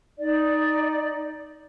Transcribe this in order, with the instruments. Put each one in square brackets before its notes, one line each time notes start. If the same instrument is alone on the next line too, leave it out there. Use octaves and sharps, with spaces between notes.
[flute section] D#4 D5